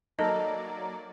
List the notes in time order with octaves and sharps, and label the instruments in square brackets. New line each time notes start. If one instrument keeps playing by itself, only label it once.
[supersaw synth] F#3 A#3 D5 [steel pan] D#4 A4 A#4 [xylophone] D#5 [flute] A#5